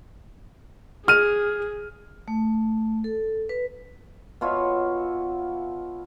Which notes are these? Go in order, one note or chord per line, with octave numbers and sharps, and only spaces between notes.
G#4 F6 D#7
A3
A4
B4
B2 F4 C#5 E5